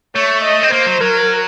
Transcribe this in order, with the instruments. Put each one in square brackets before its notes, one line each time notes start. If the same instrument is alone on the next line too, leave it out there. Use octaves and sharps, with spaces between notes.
[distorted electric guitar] A3 [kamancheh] C#5
[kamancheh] D#5
[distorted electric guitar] C4
[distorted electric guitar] A#3 [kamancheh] C5
[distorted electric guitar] F#3
[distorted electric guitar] F#3 [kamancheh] A#4